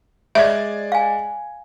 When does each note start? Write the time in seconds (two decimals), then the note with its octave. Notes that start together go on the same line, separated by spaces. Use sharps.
0.35 G#3 C#5 D5 E5 G#6
0.92 F5 G#5